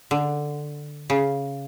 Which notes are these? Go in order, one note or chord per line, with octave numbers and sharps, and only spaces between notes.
D3
C#3